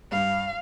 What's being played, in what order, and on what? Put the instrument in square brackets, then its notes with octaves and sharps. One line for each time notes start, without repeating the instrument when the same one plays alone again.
[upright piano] G2 [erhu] F5